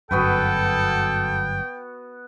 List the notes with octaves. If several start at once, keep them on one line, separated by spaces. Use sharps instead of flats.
G1 F#2 B3 F#4 A4 B4 G5